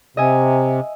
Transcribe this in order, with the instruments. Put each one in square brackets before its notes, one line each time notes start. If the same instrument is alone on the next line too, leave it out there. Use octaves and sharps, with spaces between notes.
[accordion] C3 [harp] D#5 E5 G#5